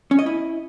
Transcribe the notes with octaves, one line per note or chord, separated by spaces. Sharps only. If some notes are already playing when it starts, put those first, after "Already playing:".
C#4
D#5
E4